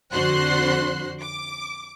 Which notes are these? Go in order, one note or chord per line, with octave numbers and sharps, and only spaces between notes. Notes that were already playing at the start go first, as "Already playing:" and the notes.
F2 D3 F#4 C5 C6 F#6
D6